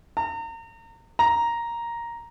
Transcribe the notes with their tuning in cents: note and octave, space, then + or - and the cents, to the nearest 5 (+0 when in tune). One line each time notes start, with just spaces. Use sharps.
A#5 -35
A#5 +5